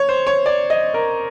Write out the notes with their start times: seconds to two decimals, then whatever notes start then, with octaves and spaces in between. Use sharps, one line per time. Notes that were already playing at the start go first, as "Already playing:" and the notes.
Already playing: C#5
0.09 C5
0.27 C#5
0.46 D5
0.70 D#5
0.94 A#4